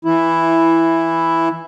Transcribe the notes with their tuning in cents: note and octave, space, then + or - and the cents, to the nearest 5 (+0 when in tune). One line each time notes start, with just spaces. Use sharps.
E3 +0 E4 +5